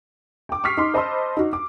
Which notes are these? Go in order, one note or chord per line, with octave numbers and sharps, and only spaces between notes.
G5 D6
C#6 D#6 F6 B6 C7
D#4 C6
C5 D#5 A5 B5 C6 E6
D#4 F#4
D6